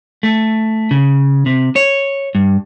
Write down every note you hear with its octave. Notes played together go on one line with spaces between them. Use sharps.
A3
C#3
C3
C#5
G2